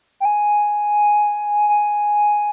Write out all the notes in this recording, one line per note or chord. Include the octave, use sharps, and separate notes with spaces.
G5
G#5
G#5